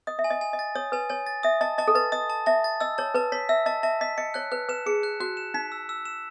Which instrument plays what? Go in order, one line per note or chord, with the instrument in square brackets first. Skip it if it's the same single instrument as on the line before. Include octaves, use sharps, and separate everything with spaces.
[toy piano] D#5 [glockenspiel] D#6
[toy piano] E5
[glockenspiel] G#5
[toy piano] D#5
[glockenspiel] G#5
[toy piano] D#5
[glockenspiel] A6
[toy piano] C#5 [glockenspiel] D#6
[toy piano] B4 [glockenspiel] G#5
[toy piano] C#5 [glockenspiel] G#5
[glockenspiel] A6
[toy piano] E5 [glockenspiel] D#6
[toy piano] D#5 [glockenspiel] A5
[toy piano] D#5 [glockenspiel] A5
[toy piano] A4
[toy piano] B4 [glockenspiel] A6
[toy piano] D#5 [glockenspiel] D#6
[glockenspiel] A5
[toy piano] E5 [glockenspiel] A5
[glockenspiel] A6
[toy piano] D#5 [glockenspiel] E6
[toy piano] C#5 [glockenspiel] A5
[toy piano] B4 [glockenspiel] A5
[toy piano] C#5 [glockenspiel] B6
[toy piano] E5 [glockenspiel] E6
[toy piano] D#5 [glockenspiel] A5
[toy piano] E5 [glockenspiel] A5
[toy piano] D#5 [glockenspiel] B6
[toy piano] D#5 [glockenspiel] C#7
[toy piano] C#5 [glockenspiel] F#6
[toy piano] B4 [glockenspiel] F#6
[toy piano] B4 [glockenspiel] E7
[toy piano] G#4 [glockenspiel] C#7
[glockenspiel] F#6
[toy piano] F#4 [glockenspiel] F#6
[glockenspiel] E7
[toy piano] D#4 [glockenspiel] B6
[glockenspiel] E6
E6
E7